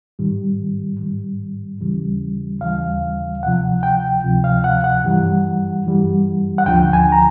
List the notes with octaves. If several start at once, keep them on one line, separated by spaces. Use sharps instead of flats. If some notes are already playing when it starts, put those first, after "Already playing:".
G#2 D#3 G3
G#2 D#3 G3
D#2 C#3 E3 G3
D#2 C#3 E3 G3 F5
D2 C3 F3 F#5
G5
D2 C3 F3
F5
F#5
F#5
G2 E3 G3
G2 E3 G3
F#5
D2 D3 F3 G5
G#5
A#5